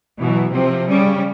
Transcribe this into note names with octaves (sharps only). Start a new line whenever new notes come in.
B2 E3 F#3
C3 F3 C4
C#3 G3 C#4